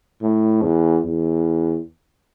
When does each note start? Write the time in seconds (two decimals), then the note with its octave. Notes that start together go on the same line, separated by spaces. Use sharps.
0.22 A2
0.62 E2
1.05 E2